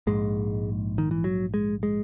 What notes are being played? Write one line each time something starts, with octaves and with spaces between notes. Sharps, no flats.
A#1 G#2 G#3
D#3
E3
F#3
G#3
G#3